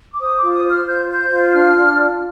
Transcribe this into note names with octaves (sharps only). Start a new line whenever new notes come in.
D6
C5 D#6
D6
F4
D#6
C5
F6
F4 G6
C5 G6
F4
D4 F6
D4
F4